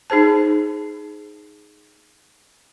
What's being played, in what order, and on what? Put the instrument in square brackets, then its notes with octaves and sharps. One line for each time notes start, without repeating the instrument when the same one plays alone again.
[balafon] D#4 G#4 C5 A5